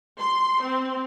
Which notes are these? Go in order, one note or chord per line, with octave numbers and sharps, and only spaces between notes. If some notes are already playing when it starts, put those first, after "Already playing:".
C6
C4